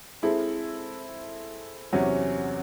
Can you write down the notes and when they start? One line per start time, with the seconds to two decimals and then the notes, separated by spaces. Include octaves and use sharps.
0.22 G#3 C4 E4 A4
1.93 E2 C3 F#3 C#4